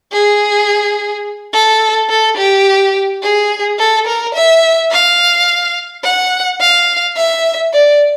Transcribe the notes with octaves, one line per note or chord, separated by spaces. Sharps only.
G#4
A4
A4
G4
G#4
A4
A#4
E5
F5
F#5
F5
E5
D5